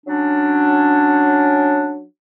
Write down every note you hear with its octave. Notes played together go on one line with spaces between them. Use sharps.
F#3 C#4 D4